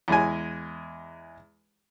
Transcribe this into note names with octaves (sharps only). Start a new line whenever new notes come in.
E2 G#3 G#5